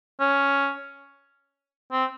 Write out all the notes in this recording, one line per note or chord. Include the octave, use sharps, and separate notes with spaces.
C#4
C4